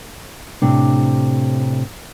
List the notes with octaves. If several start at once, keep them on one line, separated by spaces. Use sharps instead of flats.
A2 C3 D4